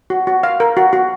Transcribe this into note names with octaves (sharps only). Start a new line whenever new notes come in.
F#4
F#4
F5
A#4
F#4
F#4